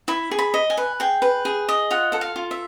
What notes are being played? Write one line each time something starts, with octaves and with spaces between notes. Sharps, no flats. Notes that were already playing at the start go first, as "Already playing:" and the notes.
E4 B5
G#4
B5
D#5
G#5
B4
G#4 G5
B4
G#4
D#5
F4 F#5
A4 F#5
F5
F4
E5